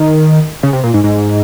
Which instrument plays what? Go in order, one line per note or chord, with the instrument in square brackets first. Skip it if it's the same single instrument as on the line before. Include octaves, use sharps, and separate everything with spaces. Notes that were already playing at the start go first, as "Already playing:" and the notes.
Already playing: [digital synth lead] D#3
C#3
C3
A#2
G#2
G#2